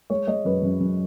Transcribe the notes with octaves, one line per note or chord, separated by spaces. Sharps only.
G#3 C#5
G#3 D#5
F#2 B4
F#2
F#2